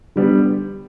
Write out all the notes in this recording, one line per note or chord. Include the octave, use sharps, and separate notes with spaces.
D3 G3 B3